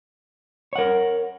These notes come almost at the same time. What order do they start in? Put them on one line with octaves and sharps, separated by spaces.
C#5 F#5 A#4